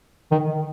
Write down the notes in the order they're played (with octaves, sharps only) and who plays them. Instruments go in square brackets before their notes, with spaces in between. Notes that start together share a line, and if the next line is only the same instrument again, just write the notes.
[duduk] D#3